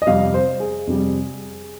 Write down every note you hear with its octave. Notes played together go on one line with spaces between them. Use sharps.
D#5
F2 C3 G3 F5
C5
G#4
F2 C3 G3